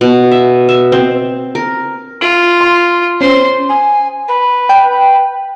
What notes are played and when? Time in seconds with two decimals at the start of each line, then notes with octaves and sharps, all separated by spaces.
0.01 B2
0.32 E5
0.69 E5
0.92 C4
1.55 A#4
2.21 F4 D7 F#7
2.61 C6
3.21 C#4 C5 C6
3.69 G#5
4.27 B4
4.69 G5